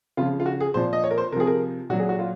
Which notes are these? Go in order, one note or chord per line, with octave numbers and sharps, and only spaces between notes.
C#3 F3 F4
F4
F#4
G#4
A#2 F3 C5
D#5
C#5
A#4
C5
C3 F3 G#4 A#4
A#4
A#2 F#3 F#4
G#4
F#4
F4